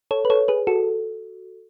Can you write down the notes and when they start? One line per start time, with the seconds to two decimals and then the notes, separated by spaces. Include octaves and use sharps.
0.11 A4 C#5
0.25 B4
0.30 A4 C#5
0.48 G#4 B4
0.67 F#4 A4